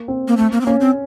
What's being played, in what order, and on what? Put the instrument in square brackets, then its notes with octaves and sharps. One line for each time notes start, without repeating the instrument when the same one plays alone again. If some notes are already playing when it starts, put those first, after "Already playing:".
Already playing: [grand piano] A#3
C4
[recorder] A#3
A3
A#3
C4
[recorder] A#3 [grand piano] C#4
[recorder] C4